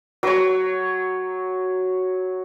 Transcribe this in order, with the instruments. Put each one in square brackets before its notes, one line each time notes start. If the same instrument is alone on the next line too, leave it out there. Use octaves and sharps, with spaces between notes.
[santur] F#3 C#5